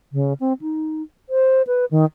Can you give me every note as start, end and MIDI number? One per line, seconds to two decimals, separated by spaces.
0.13 0.33 49
0.40 0.53 60
0.61 1.02 63
1.29 1.62 72
1.67 1.85 71
1.91 2.05 51